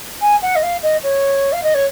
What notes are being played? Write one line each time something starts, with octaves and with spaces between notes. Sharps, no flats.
G#5
F#5
D#5
F5
D#5
C#5
F5
D#5
C#5